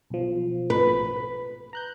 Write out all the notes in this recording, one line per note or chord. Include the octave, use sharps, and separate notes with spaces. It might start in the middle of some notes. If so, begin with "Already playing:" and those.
B1 F3
B4
B5
A#5 F#6 G6